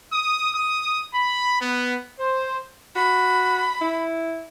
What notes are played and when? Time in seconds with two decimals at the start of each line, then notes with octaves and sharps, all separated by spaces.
0.12 D#6
0.53 D#6
1.12 B5
1.59 B3
2.18 C5
2.96 F#4 B5
3.81 E4